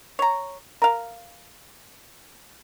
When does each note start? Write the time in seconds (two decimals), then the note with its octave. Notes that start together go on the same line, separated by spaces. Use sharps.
0.19 C#5 A#5
0.82 A#4 F5